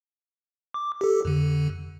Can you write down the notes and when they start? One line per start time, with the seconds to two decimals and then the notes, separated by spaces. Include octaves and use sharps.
0.74 D6
1.01 G4 A4
1.25 F2 D3